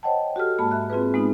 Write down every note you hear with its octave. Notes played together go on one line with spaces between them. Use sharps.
C5 C#5 D#5 F#5 G5 A5
F#4 G4 A4 F6
G#2 G#3 A#3 A5 B5
E5 B5 F#6
C4 F4 G#4 B4
G#3 B3 D#4